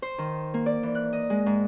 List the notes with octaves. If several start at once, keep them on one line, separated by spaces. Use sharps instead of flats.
C5
D#3
A#3
D5
E3
F#6
D#5
G#3
G#2